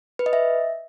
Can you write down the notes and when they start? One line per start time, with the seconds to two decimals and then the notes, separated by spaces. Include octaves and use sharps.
0.19 B4
0.26 D#5
0.33 E5